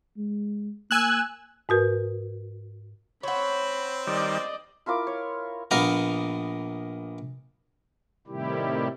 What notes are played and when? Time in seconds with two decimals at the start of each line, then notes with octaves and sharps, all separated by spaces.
0.17 G#3
0.91 A#3 G#5 E6 F#6
1.69 G#2 F#4 A#4 B4
3.23 C4 C5 C#5 F#5 B5
4.07 D#3 G3 D5 D#5
4.86 E4 F4 A#4 D6
5.07 C#5
5.71 A#1 A#3 B3 A#4 A#5
8.27 A2 C3 D#3 G3 E4 G4